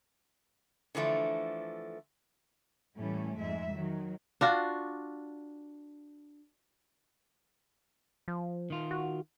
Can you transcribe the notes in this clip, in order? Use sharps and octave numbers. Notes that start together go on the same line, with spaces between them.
D3 E3 F3 A3
A2 E3 G3 A3 C#4
F2 G#2 G#3 E5
D#3 F#3
D4 F4 F#4
F3
D#3 F4
F#4